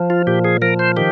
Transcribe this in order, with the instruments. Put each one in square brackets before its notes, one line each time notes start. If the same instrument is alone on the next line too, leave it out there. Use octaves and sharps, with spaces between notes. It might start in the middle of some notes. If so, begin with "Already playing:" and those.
Already playing: [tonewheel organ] F3
F4
A#2 G4
G#4
F3 A#4
C5
D#3 G4